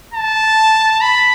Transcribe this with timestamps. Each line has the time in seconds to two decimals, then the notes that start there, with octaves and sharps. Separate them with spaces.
0.14 A5
1.01 B5